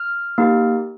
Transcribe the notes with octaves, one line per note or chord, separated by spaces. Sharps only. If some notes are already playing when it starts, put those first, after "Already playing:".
Already playing: F6
A#3 D#4 G4